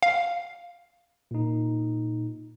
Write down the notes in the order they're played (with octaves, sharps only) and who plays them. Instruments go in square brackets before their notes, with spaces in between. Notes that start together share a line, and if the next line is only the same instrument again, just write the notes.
[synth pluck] F5
[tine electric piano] A#2 D#4